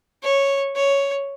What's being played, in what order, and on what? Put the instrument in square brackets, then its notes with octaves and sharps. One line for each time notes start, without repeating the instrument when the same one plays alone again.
[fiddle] C#5
C#5